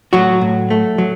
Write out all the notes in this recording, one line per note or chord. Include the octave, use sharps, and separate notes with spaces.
A2 F#3 F#4
A2
A3
F#3